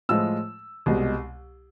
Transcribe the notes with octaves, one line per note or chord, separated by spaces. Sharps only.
A2 F3 G#3 E6
C2 B2 G#3